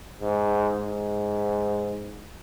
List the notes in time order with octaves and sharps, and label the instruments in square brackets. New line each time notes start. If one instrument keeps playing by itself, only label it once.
[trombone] G#2
G#2